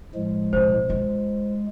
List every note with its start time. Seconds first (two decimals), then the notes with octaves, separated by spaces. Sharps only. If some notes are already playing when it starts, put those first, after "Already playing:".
0.15 A2 F3 G#3
0.53 B2 C4 C5
0.90 G#3 F4